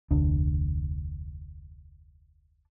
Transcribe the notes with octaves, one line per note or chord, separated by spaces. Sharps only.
F1 D2 D4